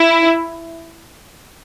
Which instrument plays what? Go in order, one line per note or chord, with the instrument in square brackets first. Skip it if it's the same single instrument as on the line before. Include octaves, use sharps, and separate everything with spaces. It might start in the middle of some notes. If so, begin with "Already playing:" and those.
Already playing: [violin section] E4